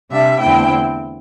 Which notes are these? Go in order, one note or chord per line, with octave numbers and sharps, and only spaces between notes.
C3 G3 D4 E5
E2 D3 A3 C4 E4 G5